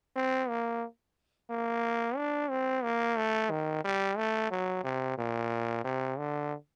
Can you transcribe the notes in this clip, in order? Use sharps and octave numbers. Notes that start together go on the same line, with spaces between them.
C4
A#3
A#3
D4
C4
A#3
A3
D#3
G3
A3
F#3
C3
A#2
C3
D3